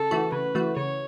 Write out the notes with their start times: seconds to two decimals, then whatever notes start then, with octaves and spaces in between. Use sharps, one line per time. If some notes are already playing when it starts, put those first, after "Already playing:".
Already playing: C#3 A4
0.11 E3 A3 F#4
0.32 C#3 B4
0.55 E3 A3 F#4
0.77 C#3 C#5